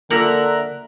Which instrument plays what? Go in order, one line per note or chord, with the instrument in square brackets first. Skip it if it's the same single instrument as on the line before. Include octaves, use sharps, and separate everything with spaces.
[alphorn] D3 [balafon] A#3 F4 [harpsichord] A#4 [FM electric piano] E5 A#5 F#6